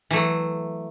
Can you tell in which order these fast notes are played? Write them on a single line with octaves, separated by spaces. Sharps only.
E3 A3 F#3